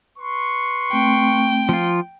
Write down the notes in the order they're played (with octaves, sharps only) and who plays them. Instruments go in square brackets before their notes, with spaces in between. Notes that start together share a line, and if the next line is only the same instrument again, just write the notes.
[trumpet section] B4 C6 C#6
[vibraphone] A3 C4 [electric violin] G5
[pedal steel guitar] F3 F4